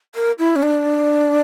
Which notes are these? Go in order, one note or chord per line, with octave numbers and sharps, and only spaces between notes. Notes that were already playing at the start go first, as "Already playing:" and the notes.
A#4
E4
C#4
D4